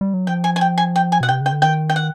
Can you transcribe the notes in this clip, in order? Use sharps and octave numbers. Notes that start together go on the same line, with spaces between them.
G3
F#3
F3 G5
G#5
G#5
G5
G#5
G5
G#5
B2 F#5
G5
C3
C#3 G5
D3
D#3 G5
G5
F#5